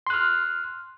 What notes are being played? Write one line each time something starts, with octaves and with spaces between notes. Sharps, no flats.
C6 F6 F#6